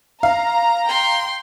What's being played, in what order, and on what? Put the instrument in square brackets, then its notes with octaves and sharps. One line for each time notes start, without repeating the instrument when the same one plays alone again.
[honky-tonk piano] F5 [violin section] A#5
[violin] G5 C6